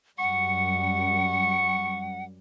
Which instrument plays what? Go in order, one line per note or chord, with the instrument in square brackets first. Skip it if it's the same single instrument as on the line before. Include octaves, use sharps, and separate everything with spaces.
[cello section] F#2 G3 [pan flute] F#5 [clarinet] C#6